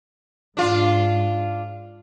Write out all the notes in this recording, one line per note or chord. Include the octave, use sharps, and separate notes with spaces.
G#2 D4 F4